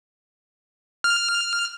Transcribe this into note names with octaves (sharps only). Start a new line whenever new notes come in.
F6